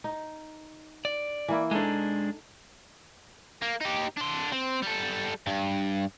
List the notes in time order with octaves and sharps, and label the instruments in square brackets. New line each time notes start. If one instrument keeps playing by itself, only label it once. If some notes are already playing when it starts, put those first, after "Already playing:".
[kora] D#4
[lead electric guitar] D5
[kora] E3 A#3 E4
[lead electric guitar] G#3 D4 [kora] D#4 A4 C5
[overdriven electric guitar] A#3
D#4 G4
D4 C6
C4
G3 A4
G2